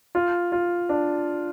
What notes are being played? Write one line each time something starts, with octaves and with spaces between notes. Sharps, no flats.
F4
F4
D4